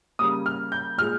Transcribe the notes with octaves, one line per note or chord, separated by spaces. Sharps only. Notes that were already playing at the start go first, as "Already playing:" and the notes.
C#3 G3 A#3 D#6
F6
G6
A#2 G#3 F6